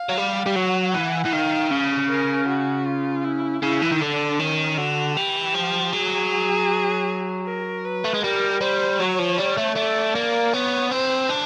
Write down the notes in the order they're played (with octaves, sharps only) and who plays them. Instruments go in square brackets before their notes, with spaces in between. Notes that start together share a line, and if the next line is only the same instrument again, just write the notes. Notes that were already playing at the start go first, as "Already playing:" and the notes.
Already playing: [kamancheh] F5
[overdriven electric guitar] F#3
G3
G3
[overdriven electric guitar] F#3 [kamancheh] F#5
[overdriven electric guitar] E3
E3
[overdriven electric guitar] D#3 [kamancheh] F5
[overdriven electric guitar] C#3
[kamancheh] A#4
F#4
F4
E4
[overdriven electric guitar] C#3 [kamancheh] E4
[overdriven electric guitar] E3
D#3
[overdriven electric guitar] D3 [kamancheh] D4
[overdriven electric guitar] D#3 [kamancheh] C#4
[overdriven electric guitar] D3 [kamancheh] F#4
[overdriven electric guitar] E3 [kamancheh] G4
[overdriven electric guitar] F3
[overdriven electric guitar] F#3 [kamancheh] G#4
[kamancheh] A#4
B4
[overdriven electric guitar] A3
G#3
[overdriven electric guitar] G3 [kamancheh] A#4
[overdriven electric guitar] G3 [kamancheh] C5
[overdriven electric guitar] F#3 [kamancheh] C#5
[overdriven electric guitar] F3
G3
A3
[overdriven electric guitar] A3 [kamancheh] D5
[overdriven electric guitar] A#3
[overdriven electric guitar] B3 [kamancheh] C#5
[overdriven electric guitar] C4 [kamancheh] C5
[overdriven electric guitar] D4